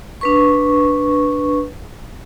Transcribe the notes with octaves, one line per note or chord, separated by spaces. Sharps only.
D4 B4 C#6